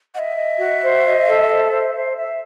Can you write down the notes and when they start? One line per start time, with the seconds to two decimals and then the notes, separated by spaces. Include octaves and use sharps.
0.14 D#5 E5 F#5
0.37 D#5
0.60 F#4
0.83 C5
1.05 D#5
1.27 A4
1.50 C5
1.71 C5
1.94 C5
2.16 E5